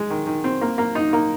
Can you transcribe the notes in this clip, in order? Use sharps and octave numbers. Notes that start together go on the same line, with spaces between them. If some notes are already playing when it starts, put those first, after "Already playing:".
Already playing: G#3
D#3
D#3
C4
A#3
A#3
D#4
A#3